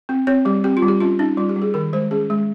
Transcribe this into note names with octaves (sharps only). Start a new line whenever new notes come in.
C4
C4 C#5
G3 G4
C4 G4
F4
G3
G4
C#4 F4
C#4 D#4
G3 F4
G4
G3
G#4
D#3 A#4
G#3 C5
C#4 G#4
G#3